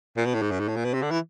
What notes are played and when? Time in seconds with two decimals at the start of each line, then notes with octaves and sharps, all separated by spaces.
0.17 A#2
0.25 B2
0.34 A2
0.42 G#2
0.51 F#2
0.60 G#2
0.68 A2
0.77 A#2
0.85 B2
0.94 C3
1.02 D3
1.11 E3